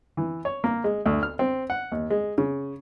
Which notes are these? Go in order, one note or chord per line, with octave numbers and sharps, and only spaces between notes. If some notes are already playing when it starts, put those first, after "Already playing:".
E3
C#5
A#3
G#3
D2
F6
C4
F#5
D#2
G#3
C#3